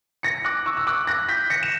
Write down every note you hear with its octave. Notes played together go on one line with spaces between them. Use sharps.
A#6 C#7
D6 F#6
C#6 E6
E6
D6 F#6
F#6 A#6
G6 B6
A#6 C#7
E7